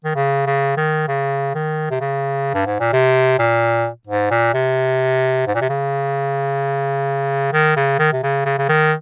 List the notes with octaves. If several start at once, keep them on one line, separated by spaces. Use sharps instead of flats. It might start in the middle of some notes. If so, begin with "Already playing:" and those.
D#3
C#3
C#3
D#3
C#3
D#3
C3
C#3
G2
G#2
A#2
C3
A#2
G#2
A#2
C3
G#2
A#2
C3
C#3
D#3
C#3
D#3
C3
C#3
C#3
C#3
D#3